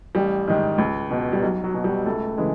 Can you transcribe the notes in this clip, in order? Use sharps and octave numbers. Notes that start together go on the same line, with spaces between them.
A1 G3
G#2 D#3
C#2
B2
G3
B1 F#3
F#3
B2
G3
C#2 A3
C#3 E3 G#3